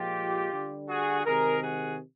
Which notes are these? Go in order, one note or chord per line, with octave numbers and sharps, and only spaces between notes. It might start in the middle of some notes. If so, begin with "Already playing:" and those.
Already playing: A#2 F3 G#3 F4 G4
D3 G3
F#4 G#4
C3 D#3 G#3 G#4 A#4
F#4 G#4